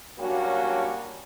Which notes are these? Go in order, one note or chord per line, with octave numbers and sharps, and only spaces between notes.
F#3 G3 A#3 C#4 D4 F#4